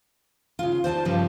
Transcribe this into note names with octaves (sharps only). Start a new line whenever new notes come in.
C#3 F4
C5 D5 G#5 A5
G2 C#3 F3 G3